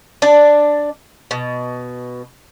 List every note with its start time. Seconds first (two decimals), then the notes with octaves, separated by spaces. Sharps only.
0.22 D4 D5
1.31 B2